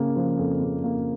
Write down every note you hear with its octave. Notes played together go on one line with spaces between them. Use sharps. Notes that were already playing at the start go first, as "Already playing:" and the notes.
Already playing: C#3 A#3
F3
F2
C#3
A#3